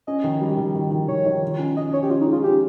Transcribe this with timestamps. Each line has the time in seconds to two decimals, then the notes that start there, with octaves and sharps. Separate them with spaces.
0.07 C#4 D#5
0.24 D#3
0.41 G3
0.57 D#3
0.75 D#3
0.91 D#3
1.08 D#3 C#5
1.26 D#3
1.42 F4
1.59 C#4
1.76 C#4 D#5
1.92 C#4 C#5
2.03 G4
2.10 C#4 F4
2.21 D#4
2.26 G#3
2.32 F4
2.44 C#4 G4